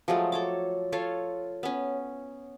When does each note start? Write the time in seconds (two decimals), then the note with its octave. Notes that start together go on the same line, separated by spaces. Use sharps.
0.08 F3 F#3 G#3 A3
0.32 A4 C#5 D6
0.92 F4 A4 C#5 F5
1.63 B3 C#4